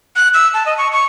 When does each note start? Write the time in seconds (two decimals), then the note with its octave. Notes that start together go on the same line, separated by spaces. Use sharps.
0.16 F#6
0.34 E6
0.54 A5
0.66 D#5
0.78 C#6
0.92 C#6